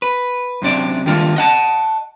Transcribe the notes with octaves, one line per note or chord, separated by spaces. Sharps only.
B4
F#2 C3 D4 D5
D#3 G3 G#3 A#3 D4 F4
D#5 F#5 A5